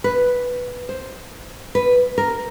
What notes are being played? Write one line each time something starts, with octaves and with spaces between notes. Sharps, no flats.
B4
C5
B4
A#4